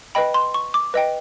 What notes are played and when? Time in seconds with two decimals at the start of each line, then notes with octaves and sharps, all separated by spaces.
0.15 B4 D#5 G5 B5
0.34 C6
0.54 C#6
0.74 D6
0.94 B4 D#5 G5